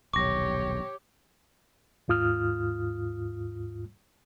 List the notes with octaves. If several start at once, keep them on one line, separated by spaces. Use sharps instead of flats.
D#1 B1 G4 C#5 C#6 D6 A#6
D#2 G#2 F4 D#6 F6